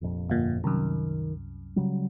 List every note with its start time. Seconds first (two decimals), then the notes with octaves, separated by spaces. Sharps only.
0.01 F1 A#1 F2
0.29 G1 A#2
0.64 C2 F#2 D#3
1.76 C#3 F#3 G3